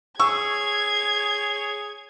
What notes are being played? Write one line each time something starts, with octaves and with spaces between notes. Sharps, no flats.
G#4 C#5 C#6 E6 G#6